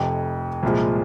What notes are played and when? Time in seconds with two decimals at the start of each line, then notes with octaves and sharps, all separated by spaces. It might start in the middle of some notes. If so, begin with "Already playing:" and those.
Already playing: F1 F2 C3
0.63 C2 A#2 F3 G#3